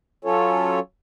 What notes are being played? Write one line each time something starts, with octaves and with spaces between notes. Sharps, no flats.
F#3 C#4 F4 A4 C#5